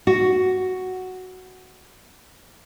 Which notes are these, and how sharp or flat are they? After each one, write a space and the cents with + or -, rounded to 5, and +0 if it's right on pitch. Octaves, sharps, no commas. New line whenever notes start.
F#4 +5